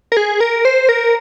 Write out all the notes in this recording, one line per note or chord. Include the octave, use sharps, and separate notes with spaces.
A#4
G#4
A#4
C5
A#4